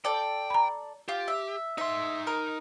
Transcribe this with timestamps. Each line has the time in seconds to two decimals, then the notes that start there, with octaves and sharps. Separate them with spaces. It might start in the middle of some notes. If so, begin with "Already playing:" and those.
0.05 A4 D5 G5
0.50 A#5 B5
1.08 F4 G4
1.28 E5
1.78 D#4 E5 C6
2.27 A#4